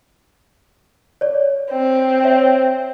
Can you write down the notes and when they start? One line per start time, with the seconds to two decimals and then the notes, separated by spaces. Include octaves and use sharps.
1.21 C#5 D5
1.71 C4
2.24 C#5 E5